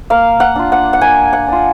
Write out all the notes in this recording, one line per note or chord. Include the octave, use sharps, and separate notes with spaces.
A#3 F5
F#5
D4 F4
F#5
F#5
A#3 G#5
F#5
D4 F4